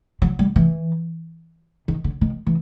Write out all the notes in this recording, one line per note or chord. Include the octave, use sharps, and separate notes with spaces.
F#3
G3
E3
D#3
D3
D#3
E3